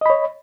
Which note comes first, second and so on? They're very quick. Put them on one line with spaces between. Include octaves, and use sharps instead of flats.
D#5 B5 C#5